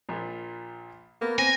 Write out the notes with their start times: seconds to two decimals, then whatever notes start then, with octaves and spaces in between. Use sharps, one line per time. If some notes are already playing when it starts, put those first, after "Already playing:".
0.09 A#1 A#2
1.21 A#3 B3
1.39 C4 G#5 A#6